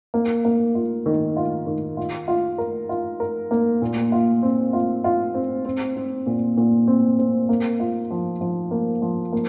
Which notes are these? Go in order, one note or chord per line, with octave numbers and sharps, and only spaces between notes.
A#3
A#3
F4
D#3
F4
D#3
F4
F4
A#4
F4
A#4
A#3
A#2
F4
C4
F4
F4
C4
C4
C4
A#2
A#2
C4
C4
A#3
F4
F3
F3
A#3
F3
A#3